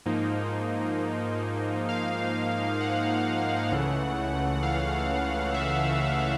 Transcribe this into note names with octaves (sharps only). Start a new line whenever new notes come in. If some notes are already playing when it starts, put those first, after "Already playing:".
G#2 F3 A#3 D#4
F5
F#5
C#2 C#3 E3 A3
F5
E5